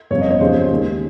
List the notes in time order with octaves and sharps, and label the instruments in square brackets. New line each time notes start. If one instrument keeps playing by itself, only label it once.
[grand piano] G1 F2 C#3 C#5
D#5
C#5
D#2 C#3 F3 G#3 C5
D#2 D#3 G#3